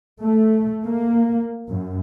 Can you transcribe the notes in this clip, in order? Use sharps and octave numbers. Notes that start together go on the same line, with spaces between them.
A3
A#3
F#2